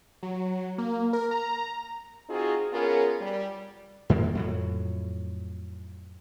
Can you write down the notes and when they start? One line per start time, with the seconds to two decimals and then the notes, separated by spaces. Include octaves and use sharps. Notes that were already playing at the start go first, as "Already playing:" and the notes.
0.23 F#3
0.78 A#3
1.13 A#4
1.31 A#5
2.28 C4 D#4 F4 F#4 G#4
2.72 B3 C#4 F4 G#4 A#4
3.20 G3
4.10 F2 D#3 G#3 A#3
4.35 F2 A2 F#3